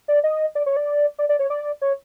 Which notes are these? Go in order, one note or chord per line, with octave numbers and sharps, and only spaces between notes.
D5
D#5
D5
C#5
D5
D5
D5
C#5
D5
C#5